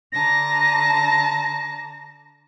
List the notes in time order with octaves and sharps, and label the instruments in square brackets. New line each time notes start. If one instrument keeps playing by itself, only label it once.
[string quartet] D3 A5 A#5 [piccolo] A#6